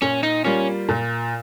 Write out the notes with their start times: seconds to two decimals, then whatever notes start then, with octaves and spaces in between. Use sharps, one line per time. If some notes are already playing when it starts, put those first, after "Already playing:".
0.02 A#2 C#4
0.23 D#4
0.44 G3 A#3 C#4 F4
0.89 A#2